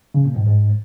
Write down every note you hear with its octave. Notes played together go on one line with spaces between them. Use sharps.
C#3
A#2
G#2
G#2